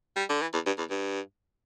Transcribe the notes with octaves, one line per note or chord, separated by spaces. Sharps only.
G3
D3
E3
E2
G2
E2
G2